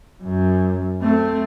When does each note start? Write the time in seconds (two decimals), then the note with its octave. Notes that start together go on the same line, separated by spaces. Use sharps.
0.23 F#2
1.02 A3 C4